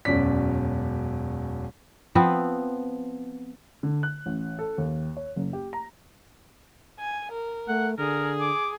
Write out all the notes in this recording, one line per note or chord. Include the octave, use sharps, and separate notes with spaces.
E1 F#2 B2 C#4 D5 B6
F3 B3 C4 B4
D3
F#6
A1
A4
D#2
C#5
F#1
G4
A#5
G#5
A#4
A3 F#5
D3 G#4 A#4
D6